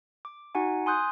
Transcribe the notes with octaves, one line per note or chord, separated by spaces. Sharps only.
D6
D#4 F#4 F#5 G#5
G#5 C6 D#6 F#6 G6